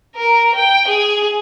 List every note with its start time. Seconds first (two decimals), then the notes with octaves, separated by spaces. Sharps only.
0.16 A#4
0.55 G5
0.88 G#4